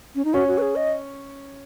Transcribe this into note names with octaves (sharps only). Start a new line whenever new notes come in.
C#4
D#4
C#4 F#4
F#4
B4
G#4
D#5